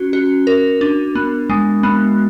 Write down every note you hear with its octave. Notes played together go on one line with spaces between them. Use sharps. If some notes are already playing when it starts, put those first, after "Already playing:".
Already playing: C#4 F#4
F#4
A#4
D4
B3
G#3
B3